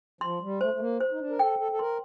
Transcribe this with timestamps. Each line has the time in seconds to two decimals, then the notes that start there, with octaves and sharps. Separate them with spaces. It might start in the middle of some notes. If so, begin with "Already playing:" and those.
0.21 F3 C6
0.41 G3
0.60 A3 C5
0.74 A3
0.80 A#3
1.00 C5
1.11 D#4
1.20 D4
1.30 A#4
1.39 A4 G5
1.59 A4
1.72 A4
1.79 A#4 C6